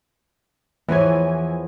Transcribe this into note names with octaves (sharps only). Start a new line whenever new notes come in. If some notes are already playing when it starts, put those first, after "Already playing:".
E2 E3 F3 C#5 G#5